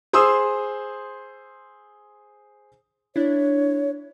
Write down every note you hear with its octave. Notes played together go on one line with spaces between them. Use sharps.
G#4 C5 C6 D#6 E6
D4 E4 C#5